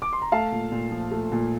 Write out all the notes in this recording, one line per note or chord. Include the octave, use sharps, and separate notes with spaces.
D6
C6
A#5
A3 F5 A5
A#2
A#2
F3
A3
A#2